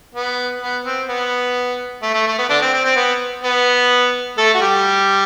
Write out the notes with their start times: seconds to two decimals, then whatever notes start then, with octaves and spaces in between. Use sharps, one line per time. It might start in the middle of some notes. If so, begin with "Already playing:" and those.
0.15 B3
0.62 B3
0.85 C4
1.09 B3
2.02 A3
2.14 A3
2.27 A3
2.39 B3
2.50 D3 D4
2.62 C4
2.74 C4
2.85 C4
2.96 B3
3.44 B3
4.38 A3 A4
4.54 F#4
4.61 G3 G4